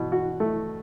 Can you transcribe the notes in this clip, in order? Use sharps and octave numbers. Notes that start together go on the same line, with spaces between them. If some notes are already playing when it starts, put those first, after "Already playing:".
Already playing: B2
F#4
A3